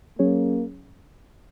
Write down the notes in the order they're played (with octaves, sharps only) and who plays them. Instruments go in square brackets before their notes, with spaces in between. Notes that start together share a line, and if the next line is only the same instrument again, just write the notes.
[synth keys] F#3 C#4 G#4 C#5 [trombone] A#3